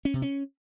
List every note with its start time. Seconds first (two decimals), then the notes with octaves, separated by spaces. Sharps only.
0.05 C#4
0.14 C3
0.22 C#4